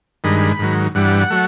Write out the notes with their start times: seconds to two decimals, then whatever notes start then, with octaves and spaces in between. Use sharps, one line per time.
0.24 G2 D#3 G#3 B5
0.59 G#2 D#3 F#3
0.95 G2 E3 G3 F#5
1.30 F#3 A3